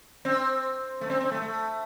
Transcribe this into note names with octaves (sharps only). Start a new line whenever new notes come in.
C4
A3
C4
C4
A3
A3